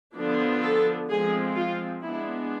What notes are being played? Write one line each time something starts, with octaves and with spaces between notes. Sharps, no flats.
D3 F3 B3 D4
A4
F3 G#3 C4 G#4
F4
G#3 B3 D4 E4